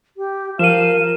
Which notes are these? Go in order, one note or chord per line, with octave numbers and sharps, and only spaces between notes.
G4
F3 A#4 F5 D#7 E7